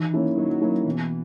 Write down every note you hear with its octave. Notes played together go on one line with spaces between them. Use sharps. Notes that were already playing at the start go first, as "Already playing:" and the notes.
Already playing: D#3 E3
A#3 C#4 E4
D#3 F#3
A#3 C#4 E4
B2 E3